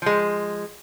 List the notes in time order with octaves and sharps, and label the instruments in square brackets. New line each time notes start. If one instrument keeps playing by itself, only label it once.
[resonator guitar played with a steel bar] F3 G#3